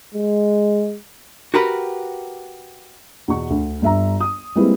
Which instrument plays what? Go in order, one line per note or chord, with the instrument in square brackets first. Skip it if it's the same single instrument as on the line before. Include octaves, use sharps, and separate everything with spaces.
[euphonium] G#3
[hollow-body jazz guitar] F#4 G4 A#4 B4
[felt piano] E2 B2 C#6
D2
G1 E5 A#5
D#6
G3 G#3 A#3 C4 E4 B4